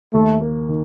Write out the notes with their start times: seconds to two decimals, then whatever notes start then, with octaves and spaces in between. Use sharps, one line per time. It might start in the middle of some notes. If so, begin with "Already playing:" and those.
0.14 D#2 A3
0.41 A#3
0.69 D#3